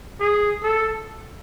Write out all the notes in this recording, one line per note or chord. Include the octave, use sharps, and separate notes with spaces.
G#4
A4